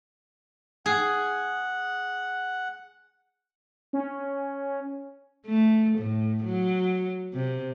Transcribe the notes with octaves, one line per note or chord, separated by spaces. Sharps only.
G#4 F#5
C#4
A3
A2
F#3
C3